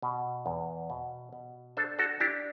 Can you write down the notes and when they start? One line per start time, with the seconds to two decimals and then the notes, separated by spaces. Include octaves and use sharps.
0.02 B2
0.46 E2
0.90 B2
1.33 B2
1.77 D4 A4 C5
1.99 F#4 A4
2.20 D4 E4 G4